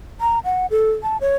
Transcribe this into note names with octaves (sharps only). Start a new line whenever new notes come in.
A#5
F#5
A4
A5
C#5